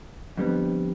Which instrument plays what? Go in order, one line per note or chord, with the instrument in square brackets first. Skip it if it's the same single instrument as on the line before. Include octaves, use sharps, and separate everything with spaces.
[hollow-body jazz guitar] F2 D3 G3 B3